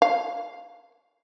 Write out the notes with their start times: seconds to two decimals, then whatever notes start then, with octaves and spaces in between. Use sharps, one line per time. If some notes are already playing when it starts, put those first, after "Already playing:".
0.02 F5